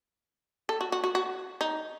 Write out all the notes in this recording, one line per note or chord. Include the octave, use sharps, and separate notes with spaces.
A4
F#4
F#4
F#4
F#4
D#4